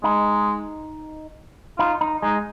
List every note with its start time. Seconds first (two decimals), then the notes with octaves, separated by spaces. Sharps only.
0.03 G#3 D#4
1.78 D#4 F4
2.01 D#4
2.22 G#3 D#4